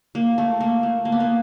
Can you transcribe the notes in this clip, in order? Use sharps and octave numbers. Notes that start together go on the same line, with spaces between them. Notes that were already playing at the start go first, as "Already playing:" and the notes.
A#3
A3
A#3
A3
A#3
B3
A#3